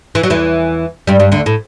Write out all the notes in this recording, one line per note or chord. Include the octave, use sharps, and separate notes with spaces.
E3
F#3
E2 E3
G2 G3
G2 G3
D2 D3
A2